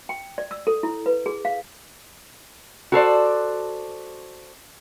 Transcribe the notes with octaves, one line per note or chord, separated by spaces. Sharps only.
G5
D5
E6
A4
E4
B4
G#4
F5
F#4 A4 C5 D5